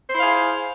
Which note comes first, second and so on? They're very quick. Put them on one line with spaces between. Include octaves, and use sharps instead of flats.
C5 E4 F5 G#4